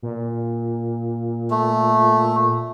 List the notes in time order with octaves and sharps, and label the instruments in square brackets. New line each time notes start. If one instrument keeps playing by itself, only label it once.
[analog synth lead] A#2
[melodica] A3